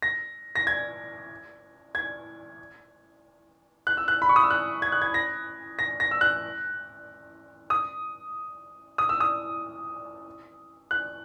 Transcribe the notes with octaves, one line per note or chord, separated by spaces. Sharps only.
A#6
A#6
G#6
G#6
F#6
E6
F#6
B5
C#6
D#6
E6
F#6
G#6
F#6
G#6
A#6
A#6
A#6
E6
F#6
D#6
D#6
E6
D#6
F#6